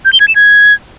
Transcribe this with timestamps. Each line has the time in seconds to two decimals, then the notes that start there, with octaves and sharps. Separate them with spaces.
0.05 G6
0.13 G7
0.20 G#6
0.28 E7
0.36 G#6